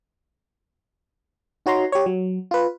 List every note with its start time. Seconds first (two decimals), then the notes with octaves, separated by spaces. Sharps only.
1.66 D#4 F#4 C#5 A#5 C6
1.92 G4 C#5
2.06 F#3
2.51 F4 B4